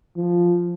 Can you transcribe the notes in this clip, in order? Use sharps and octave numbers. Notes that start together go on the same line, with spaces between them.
F3